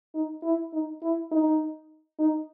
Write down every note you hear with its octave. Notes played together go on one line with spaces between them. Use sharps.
D#4
E4
D#4
E4
D#4
D#4